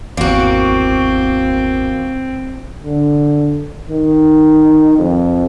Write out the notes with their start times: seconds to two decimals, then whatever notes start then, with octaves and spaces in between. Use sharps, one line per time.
0.17 G#1 E2 A#3 C4 F#4
2.83 D3
3.89 D#3
4.98 F2